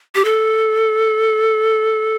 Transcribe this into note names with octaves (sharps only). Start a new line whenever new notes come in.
G4
A4